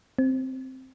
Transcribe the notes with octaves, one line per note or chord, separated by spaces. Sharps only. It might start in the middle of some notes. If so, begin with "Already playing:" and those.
C4